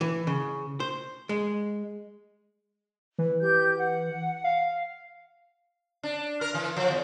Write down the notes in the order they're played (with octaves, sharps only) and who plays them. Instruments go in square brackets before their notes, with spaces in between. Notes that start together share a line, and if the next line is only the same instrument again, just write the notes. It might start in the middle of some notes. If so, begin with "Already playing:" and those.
[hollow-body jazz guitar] E3
C#3
C5
G#3
[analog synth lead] E3
[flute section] G4 G6
F#5
[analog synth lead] F5
[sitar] D4
A#4
E3
F3
E2